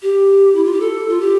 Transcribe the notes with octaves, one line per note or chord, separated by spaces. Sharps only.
G4
E4
F4
G4
A4
F4
G4